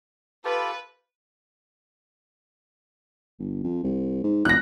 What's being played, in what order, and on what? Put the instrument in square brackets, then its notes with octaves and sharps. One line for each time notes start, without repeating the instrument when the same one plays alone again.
[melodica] F4 G4 A4 [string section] B4
[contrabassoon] G1
F2
C2
G#2
[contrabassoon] E1 [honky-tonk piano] F#6 A#6